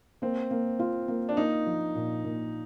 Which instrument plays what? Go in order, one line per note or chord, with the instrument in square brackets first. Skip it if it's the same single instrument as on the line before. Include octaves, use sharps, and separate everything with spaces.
[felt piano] A#3 [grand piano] C4
[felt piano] A#3
F4
A#3
[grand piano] D4
[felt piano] A#3 [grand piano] D#4
[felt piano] F3
A#2
A#2